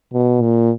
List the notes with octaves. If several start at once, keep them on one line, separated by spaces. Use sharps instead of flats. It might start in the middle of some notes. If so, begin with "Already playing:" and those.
B2
A#2